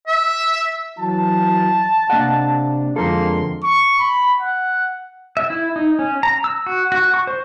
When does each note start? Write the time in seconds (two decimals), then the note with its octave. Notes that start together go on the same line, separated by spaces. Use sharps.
0.07 E5
0.98 E3 F#3 A5
2.10 C3 A#3 D4 D#5 F#5
2.96 F2 D3 F3 G#3 A#3 A4 C6
3.64 C#6
3.99 B5
4.40 F#5
5.37 E5
5.50 E4
5.76 D#4
5.99 C#4
6.23 A#5
6.44 E6
6.66 F#4
6.92 F#4
7.14 C#6
7.27 C5